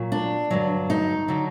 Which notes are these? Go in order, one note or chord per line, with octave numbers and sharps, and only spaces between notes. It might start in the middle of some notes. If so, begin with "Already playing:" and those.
Already playing: A#2 F#3
D4
G2 D3 F#3
D#4
D3 F#3